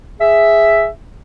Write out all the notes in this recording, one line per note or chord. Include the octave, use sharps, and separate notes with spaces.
G#4 E5